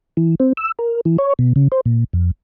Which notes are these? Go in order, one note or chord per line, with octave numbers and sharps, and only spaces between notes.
E3
C4
E6
A#4
E3
C#5
B2
C#3
C5
A#2
F2